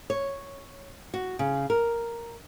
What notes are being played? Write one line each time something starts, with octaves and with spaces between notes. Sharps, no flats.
C#5
F#4
C#3
A#4